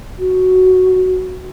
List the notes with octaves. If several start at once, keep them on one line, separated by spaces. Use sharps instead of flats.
F#4